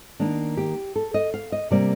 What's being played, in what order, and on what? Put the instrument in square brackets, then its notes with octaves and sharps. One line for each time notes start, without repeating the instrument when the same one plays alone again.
[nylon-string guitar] D#3 A#3 D4
G4
A4
D#5
F5
D#5
C3 G3 A#3 D5